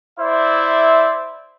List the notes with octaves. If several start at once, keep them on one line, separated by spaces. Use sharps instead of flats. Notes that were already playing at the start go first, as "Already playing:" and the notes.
E4 C5 D5 E5